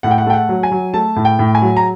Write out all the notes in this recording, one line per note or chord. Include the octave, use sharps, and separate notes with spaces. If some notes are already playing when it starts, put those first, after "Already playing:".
A2 F#5
G5
F#5
A3 G5
F#5
F#3
G#5
F#3
A3 A5
A2
G5
A2
G#5
F#3
A#5